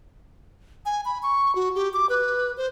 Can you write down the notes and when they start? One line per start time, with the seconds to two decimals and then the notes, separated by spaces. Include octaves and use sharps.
0.86 G#5
1.05 B5
1.23 C#6
1.55 F#4
1.75 G4
1.93 D6
2.09 B4
2.57 C5